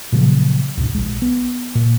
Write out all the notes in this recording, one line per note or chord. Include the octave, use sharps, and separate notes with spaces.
A#2 C#3 F3 F#3
D2 G#2 B2
A#1 G#3
B3
A#2